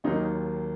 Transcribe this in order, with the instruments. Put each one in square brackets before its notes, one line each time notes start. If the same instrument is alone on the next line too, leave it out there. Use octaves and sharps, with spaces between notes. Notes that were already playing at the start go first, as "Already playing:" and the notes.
[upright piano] D#2 D#3 F#3 A#3 D#4